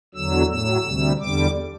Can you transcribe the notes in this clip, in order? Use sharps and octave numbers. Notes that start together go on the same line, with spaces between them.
E2 D3 F#3 E6
A2 F#3 E6
D2 C3 G3
E2 D3 G3 D6